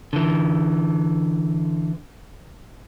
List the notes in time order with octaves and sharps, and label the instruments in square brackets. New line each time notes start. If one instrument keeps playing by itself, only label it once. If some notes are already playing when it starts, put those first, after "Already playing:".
[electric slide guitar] D3 E3